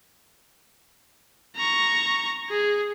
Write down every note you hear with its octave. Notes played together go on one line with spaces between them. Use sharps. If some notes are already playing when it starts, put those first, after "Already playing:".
A#5 C#6
G#4